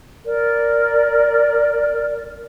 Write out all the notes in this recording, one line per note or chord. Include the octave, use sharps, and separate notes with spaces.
A#4 D5